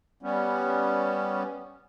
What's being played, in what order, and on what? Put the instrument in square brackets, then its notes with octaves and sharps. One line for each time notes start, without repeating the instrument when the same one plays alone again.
[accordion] G3 B3 C#4